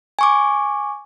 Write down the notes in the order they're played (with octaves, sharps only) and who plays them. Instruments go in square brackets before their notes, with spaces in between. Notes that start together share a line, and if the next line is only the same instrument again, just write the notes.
[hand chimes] G#5 C#6 D6